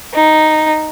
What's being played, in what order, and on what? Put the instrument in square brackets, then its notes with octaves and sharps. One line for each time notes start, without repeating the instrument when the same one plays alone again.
[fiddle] D#4